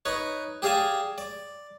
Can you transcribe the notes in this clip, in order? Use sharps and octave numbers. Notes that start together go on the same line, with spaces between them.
D#4 B4 C#5
G4 G#4 D5 F5 G#5 A5
D5